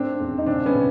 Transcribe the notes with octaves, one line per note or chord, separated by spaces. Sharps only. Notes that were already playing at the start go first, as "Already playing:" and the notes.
Already playing: G#1 A3 C4 D4
E2
D#4
C#3 C4 D4
B3 C#4
C#3